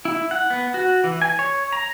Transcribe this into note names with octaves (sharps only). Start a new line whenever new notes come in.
E4
F#5
B3
F#4
E3
G#5
C#5
A#5